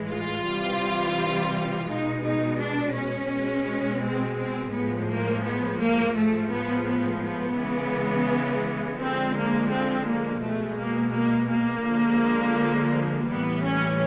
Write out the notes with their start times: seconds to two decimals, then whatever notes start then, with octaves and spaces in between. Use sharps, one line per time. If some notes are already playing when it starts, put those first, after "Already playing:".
Already playing: A2 E3 G#3
0.11 F4
0.46 C3 E3 G3
1.89 B2 G#3 D#4
2.24 D#4
2.60 D4
2.96 C#4
3.31 B2 G#3
4.03 C4
4.38 C4
4.73 A2 F3 G#3 B3
5.09 A#3
5.45 B3
5.80 A#3
6.16 A2 F3 G#3 A3
6.51 B3
6.87 B3
7.22 B3
7.58 C#3 E3 G#3
9.00 D3 F3 G#3 C4
9.37 A#3
9.71 C4
10.07 A#3
10.43 B2 G#3 A3
10.78 A#3
11.14 A#3
11.50 A#3
11.85 D3 F3 G#3
13.28 A2 E3 G3 B3
13.63 C#4